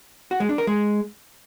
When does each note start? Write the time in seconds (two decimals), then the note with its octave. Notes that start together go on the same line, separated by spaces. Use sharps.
0.31 F#4
0.40 G#3
0.49 D4
0.58 A#4
0.67 G#3